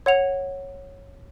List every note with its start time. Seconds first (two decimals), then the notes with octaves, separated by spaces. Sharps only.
0.06 C#5 F#5 F7